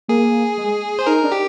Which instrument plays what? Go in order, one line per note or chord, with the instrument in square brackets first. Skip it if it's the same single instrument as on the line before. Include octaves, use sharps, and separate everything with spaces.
[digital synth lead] A#3 [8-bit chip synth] G#4
[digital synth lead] G#3
[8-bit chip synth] C5
[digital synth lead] D#4 [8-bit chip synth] A#4
[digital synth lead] D4
[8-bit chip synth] G4